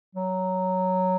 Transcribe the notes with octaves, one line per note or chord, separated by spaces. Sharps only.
F#3